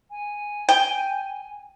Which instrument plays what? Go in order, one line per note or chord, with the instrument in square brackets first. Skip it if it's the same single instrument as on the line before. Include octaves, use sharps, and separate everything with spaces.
[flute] G#5
[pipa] G5